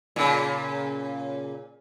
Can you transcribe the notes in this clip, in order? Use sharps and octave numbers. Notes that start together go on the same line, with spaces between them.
A#2 C#3